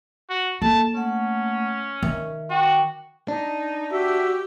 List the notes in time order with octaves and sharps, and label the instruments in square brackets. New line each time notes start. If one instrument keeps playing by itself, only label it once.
[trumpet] F#4
[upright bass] A#3 [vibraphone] A4 [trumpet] A5
[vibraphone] A3 F#5 [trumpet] C#4
[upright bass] D#3 [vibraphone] E5
[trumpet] F#4 [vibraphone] G5 D6
[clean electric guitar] D4 [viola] D#4
[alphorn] F#4 [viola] G4 [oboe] E5